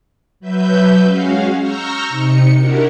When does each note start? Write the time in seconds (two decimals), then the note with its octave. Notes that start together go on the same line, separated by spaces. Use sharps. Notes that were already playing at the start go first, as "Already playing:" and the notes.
0.40 F#3 B4 E5 G6
1.02 G#3 C#4 F#4 F5
1.59 A#5 C#6 E6 F6 G6 A#6
2.09 C3 D#4 C#7
2.55 D4 E4 F#4 G4 A#4